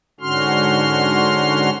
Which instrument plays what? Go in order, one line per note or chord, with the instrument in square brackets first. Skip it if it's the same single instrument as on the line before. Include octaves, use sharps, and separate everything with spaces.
[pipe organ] G#2 D3 C#4 F#4 C6 F6